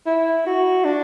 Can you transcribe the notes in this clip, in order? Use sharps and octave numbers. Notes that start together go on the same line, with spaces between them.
E4
F#4
D4